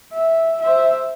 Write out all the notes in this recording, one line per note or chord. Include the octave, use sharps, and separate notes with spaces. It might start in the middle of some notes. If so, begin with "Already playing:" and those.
E5
C5 E5